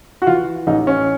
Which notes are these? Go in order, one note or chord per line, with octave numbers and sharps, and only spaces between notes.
F#4
E3 F4
A1 D#4
C#4